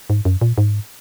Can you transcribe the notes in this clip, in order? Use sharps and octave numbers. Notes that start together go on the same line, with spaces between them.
G#2
F#2
A#2
G#2